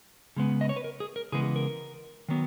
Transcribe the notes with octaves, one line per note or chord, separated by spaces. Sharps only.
C#3 G#3 B3
D#5
C#5
B4
A#4
G#4
A#4
C#3 E3 G#3 B3 G#4
A#4
D#3 F#3 B3